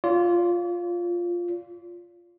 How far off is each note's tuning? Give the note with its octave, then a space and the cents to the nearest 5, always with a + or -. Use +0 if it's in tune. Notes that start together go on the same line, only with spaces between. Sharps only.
F4 +0 D5 -45